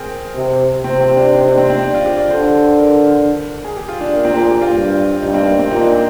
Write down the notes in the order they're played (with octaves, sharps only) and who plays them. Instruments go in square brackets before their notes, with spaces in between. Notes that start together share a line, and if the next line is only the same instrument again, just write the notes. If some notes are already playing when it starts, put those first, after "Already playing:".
Already playing: [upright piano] C4 G#4 A#4
[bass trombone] C3
[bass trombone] C3 [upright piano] C4
[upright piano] C4
D4
D#4
D4
C4
C4
D4
F4
G4
D5
[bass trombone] D3 [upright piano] C5
[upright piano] A#4
G#4
G4
F4
D4
A#3
[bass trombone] A#2 [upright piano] C4
[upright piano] G4
G4
F4
[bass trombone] G2
[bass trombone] G2 [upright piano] D#4
[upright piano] C4
A#3
C4
[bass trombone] A#2 [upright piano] D#4
[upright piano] D4
C4